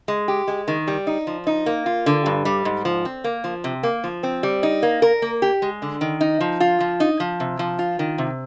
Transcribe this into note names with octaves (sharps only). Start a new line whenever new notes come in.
G#3
G4
G#3
D#3
G3
D#4
F3
D#4
A#3
F4
D3
G2
G3
G#2
F3
C4
A#3
F3
C3
A#3
F3
C4
G3
D#4
A#3
A#4
A#3
G4
G#3
D3
D#3
D#4
F3
F4
F3
D#4
F3
C3
F3
F4
D#3
C3